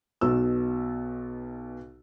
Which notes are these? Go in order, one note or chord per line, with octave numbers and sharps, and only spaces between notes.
B1 B2 E6